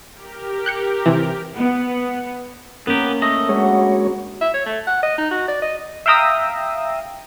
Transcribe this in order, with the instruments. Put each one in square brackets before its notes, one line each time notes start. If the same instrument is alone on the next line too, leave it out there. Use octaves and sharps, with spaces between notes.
[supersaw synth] G4 A#4
[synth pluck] F#6 G6 C#7
C3 E3
[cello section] B3
[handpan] A#3 C#4 A#4 [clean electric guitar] B3 G4
[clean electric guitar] A3 D#5
[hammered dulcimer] F#3 D4 B5 [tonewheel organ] G#3 C#5
[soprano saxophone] E5
C#5
A3
F#5
D#5
D#4
F#4
D5
D#5
[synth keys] E5 F5 G5 A#5 D#6 E6